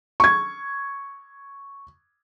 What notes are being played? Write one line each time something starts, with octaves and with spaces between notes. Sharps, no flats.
C#6 G#6